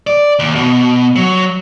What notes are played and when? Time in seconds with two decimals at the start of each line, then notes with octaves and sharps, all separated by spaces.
0.07 D5
0.39 D#2
0.55 B2
1.16 F#3